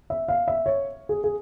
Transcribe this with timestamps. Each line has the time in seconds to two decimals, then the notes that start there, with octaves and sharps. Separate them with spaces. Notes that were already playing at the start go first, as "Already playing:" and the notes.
0.10 E5
0.28 F5
0.48 E5
0.66 C#5
1.09 G#4
1.24 G#4